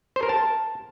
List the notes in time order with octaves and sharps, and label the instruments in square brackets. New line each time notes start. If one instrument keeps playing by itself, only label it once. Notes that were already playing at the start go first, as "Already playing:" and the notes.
[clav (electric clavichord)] C5
A#4
A5